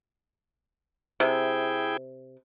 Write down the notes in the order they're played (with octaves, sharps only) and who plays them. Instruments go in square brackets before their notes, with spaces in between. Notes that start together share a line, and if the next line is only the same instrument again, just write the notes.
[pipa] C3 [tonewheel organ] E4 G#4 G5